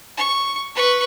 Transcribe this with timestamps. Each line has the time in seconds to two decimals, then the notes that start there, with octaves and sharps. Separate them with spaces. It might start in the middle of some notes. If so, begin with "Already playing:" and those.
0.17 C#6
0.75 B4 C#6